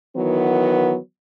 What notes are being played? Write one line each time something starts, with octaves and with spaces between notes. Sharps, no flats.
D#3 E3 F#3 B3